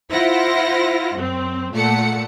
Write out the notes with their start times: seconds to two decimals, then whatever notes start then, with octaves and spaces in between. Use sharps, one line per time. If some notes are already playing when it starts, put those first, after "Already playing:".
0.11 E4 F4 C5 F#5 A#6
1.16 F#2 C4
1.74 A#2 A3 A4 F#5 C#7